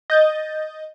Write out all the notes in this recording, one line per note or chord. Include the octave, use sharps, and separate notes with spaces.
D#5 G6 A6